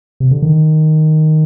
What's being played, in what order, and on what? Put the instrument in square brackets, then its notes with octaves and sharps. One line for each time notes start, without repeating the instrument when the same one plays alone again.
[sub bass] C3
D3
D#3